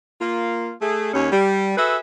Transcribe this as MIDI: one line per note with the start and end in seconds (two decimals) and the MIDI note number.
0.21 0.72 58
0.21 0.72 65
0.81 1.11 57
0.81 1.11 68
1.14 1.30 39
1.14 1.30 61
1.32 1.78 55
1.78 1.97 66
1.78 1.97 68
1.78 1.97 69
1.78 1.97 71
1.78 1.97 76